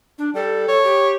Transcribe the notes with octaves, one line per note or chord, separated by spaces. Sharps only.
D4
G3 A4
C#5
G4